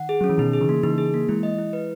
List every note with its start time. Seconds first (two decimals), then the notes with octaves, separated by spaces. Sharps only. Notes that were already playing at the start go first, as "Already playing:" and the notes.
Already playing: D#3 F#5
0.09 G#4
0.21 F#3 C#4
0.29 E3
0.38 B2 D#3 D#4
0.53 G#4
0.61 C#3 E3
0.69 A#3
0.83 C#3 E3 D#4
0.98 G#4
1.14 A#3
1.29 E3 G#3 E4
1.43 D#5
1.59 E4
1.73 B4